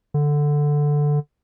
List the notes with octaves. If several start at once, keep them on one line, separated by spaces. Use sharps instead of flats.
D3